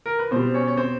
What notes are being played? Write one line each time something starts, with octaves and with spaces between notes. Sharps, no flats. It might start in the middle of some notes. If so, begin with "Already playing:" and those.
A#4
B4
B2 G3 C4 C5
C#4 C#5
C#5
C4 C5